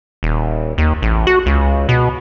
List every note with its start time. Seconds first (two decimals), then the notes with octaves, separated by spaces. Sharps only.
0.23 D#1
0.78 D#2
1.02 A1
1.27 F#4
1.46 C#2
1.89 B2